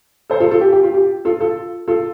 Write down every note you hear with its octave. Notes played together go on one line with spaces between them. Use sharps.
A4 C5
F4 A4
F4 A4
G4
G4
F4
G4
F4 A4
F4 A4
F4 A4